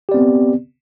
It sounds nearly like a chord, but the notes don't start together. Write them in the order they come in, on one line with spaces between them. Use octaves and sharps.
G4 D5 C4 B3